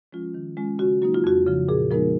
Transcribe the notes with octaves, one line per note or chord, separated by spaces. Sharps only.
F3 G#3 C#4 F4
D#3
G#3 C#4 F4
C#3 F#4
F#3 A#3 D#4 F#4
F4
F2 F#4
C#3 F3
A#2 G#4
F3 G#3 B3 D#4 A#4